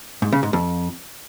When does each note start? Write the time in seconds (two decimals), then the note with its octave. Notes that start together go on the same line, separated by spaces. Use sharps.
0.22 G#2
0.32 C#3
0.43 G#2
0.53 F2